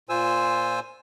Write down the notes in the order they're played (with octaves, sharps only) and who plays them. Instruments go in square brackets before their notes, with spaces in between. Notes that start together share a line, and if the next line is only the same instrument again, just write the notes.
[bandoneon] A#2 F4 C5 G#5 E6